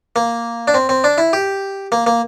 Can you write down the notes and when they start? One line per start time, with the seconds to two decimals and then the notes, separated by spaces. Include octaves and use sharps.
0.16 A#3
0.68 D4
0.74 C4
0.89 C4
1.04 D4
1.18 E4
1.33 G4
1.92 A#3
2.07 A#3